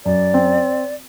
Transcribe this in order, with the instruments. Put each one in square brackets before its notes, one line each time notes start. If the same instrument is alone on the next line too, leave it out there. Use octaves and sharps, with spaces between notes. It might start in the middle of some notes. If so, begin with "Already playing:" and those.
[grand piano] F#2 [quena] D5
[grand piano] C4